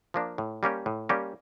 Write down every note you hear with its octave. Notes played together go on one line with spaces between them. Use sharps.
F3 A#3 D4
A2
G3 A#3 C#4 G4
A2
G3 A#3 C#4 G4